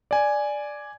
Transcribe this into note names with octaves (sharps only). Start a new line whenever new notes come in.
D5 G#5